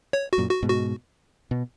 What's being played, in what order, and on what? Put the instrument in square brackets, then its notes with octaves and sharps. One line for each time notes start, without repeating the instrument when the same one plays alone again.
[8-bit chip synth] C#5
F#4
[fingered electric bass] F#2 A#2
[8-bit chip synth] F#4
[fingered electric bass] G#2 B2
[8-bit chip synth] F#4
[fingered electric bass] B2